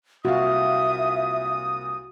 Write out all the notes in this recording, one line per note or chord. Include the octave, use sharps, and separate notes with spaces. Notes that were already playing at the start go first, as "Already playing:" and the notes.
C2 A#2 F#4 E5 F5 D#6